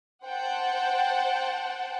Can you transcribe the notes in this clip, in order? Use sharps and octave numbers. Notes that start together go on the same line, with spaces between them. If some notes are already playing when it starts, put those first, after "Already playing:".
C5 F#5 G5 A5